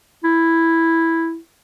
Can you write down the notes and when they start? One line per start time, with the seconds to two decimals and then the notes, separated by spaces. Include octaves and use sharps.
0.24 E4